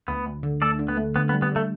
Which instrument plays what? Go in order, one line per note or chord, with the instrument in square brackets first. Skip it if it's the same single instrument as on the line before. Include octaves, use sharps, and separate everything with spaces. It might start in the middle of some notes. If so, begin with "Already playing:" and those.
[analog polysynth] D2 [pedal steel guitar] B3
[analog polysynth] D2
D3
[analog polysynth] A3 [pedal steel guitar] A4 D5
[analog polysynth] D3
[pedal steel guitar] B3
[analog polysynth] A3
[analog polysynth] D3 [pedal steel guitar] B3
[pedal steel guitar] B3
[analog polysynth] G3
[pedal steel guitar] B3
[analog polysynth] D3 [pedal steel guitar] A3